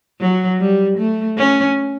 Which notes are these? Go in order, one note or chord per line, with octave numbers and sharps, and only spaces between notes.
F#3
G3
A3
C#4